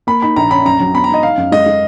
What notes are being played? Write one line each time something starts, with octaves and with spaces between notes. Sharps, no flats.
A#3 B5
D#4 B5
A#1 A#5
C#4 B5
F#2 A#5
F#3
B3 B5
A#5
G#2 D#5
D#3 F5
F#2
G#3 D#5
G#3